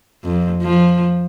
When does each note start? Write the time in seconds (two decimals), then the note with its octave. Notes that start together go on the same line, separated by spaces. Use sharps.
0.24 F2
0.62 F3